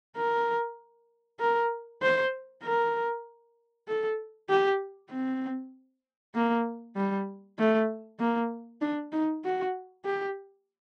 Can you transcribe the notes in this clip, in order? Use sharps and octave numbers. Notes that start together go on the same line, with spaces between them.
A#4
A#4
C5
A#4
A4
G4
C4
A#3
G3
A3
A#3
D4
D#4
F#4
G4